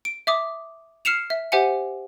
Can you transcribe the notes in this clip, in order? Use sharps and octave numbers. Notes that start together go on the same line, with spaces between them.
D7
E5 D6 D#6
F6 C7 C#7 E7 F7
E5
G4 C5 E5 F#5 G#5 C#7